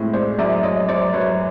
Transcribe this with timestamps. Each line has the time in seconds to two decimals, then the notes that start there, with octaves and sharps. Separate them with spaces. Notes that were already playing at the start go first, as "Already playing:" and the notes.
Already playing: A2 G#3 C4
0.14 G#3 C5 D5
0.39 F#2 D5 E5
0.63 F#2 C#5 D#5
0.89 F#2 C5 D5
1.13 F#2 B4 C#5